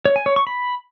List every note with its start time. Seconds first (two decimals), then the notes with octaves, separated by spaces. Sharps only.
0.05 C#5
0.16 G#5
0.26 C#5
0.36 C#6
0.47 B5